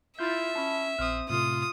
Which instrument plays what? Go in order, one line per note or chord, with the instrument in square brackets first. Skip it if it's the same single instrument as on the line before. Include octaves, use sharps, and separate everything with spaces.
[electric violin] E4 F4 [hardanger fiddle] E5 [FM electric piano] G6 A6
[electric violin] C#4 [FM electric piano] A5 B5
[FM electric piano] A#1 F6 [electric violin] C4 D#6
[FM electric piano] A2 C3 A3 [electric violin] F4 [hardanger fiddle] D#6